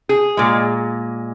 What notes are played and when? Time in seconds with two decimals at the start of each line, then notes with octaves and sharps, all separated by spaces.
0.09 G#4
0.37 A#2 G#3